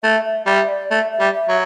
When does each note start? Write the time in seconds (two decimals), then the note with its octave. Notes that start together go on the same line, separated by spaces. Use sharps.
0.03 A3 E5
0.24 E5
0.46 G3 E5
0.69 D5
0.91 A3 E5
1.12 E5
1.20 G3
1.34 E5
1.49 F#3